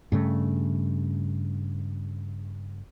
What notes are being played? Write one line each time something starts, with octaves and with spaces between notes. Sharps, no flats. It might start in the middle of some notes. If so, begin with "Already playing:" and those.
G2 C#3 A3